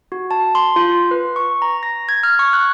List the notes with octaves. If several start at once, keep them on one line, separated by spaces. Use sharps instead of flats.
F#4
A5
C6
F4
B4
C#6
A#5
A#6
G#6
F6
C#6
F#6